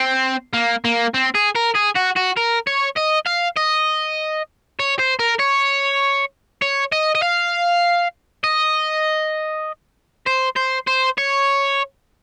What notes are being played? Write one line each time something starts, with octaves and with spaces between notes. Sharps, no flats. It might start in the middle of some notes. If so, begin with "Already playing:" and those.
Already playing: C4
A#3
A#3
C4
G#4
A#4
G#4
F#4
F#4
A#4
C#5
D#5
F5
D#5
C#5
C5
A#4
C#5
C#5
D#5
D#5
F5
D#5
C5
C5
C5
C#5